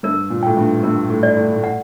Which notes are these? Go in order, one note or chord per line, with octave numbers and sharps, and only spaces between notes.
G2 A#4
A#2
A2 G5
G2
G2 A#4
A2
D5
A2
A2
F#5